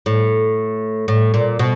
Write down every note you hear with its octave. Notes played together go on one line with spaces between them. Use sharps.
A2
A2
A#2
B2